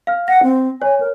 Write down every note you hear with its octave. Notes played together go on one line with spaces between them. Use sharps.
F5 F6
F#5 A#6
C4
C#5 G#5
A#4